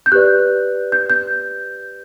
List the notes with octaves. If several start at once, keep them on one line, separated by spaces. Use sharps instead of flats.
G6
G4 B4 D5 F#6
G6
G6